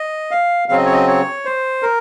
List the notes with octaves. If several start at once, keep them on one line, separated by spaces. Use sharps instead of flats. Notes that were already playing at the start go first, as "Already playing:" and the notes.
Already playing: D#5
F5
C#3 F#3 C4 F5
D#5
C#5
D#5
C#5
C5
A#4